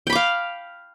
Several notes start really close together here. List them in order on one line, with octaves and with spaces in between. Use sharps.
G5 B5 D6 F5